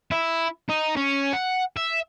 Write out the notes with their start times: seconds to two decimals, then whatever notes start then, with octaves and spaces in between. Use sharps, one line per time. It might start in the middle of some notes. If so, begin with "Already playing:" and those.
0.11 E4
0.69 D#4
0.96 C#4
1.33 F#5
1.77 E5